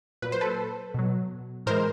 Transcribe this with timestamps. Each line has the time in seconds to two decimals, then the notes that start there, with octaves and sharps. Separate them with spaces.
0.22 A#2 F#3 B4
0.32 C5
0.41 A4 B4
0.94 B2 F#3
1.66 A2 E3 G#3 A#4 C5